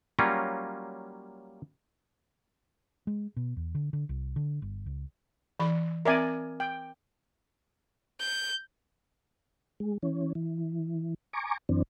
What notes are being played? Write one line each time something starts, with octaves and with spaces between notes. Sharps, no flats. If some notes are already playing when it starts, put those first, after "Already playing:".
F#3 G3 A#3 C#4 F4
G#3
B2
E2
D3
D3
C2
D3
G1
C#2
E3 B5
C4 A#4 D5 E5 G#5
G5
G6
G#3
E3 C#4
E3
G#5 A#5 C#6 D6
F#2 E3 C4 D4